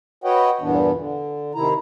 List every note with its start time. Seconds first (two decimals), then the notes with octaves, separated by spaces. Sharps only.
0.24 F#4 B4 C#5 D#5 F#5 G5
0.61 E2 G2 A#2 E3 B3 D4
0.95 D3
1.55 C3 D#3 E4 A#5